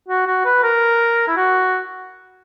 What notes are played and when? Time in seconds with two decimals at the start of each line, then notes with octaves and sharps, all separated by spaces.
0.08 F#4
0.27 F#4
0.45 B4
0.63 A#4
1.28 E4
1.37 F#4